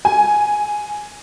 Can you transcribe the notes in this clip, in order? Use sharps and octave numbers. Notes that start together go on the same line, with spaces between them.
G#5